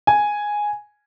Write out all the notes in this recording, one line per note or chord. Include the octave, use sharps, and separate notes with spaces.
G#5